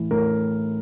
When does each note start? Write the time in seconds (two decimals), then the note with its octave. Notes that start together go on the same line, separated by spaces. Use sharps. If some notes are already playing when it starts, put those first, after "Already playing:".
Already playing: A2 E3
0.11 A2 A#4